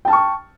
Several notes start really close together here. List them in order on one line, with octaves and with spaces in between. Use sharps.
G5 A5 F6 C#6